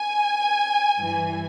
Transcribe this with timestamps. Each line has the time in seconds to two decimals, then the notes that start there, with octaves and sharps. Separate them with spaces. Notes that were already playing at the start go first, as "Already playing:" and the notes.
Already playing: G#5
0.99 G2 E3